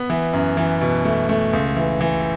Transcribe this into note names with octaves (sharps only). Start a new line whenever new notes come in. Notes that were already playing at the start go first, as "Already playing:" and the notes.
Already playing: B3
E3
F#2
E3
B2
A3
A3
C#2
E3
E3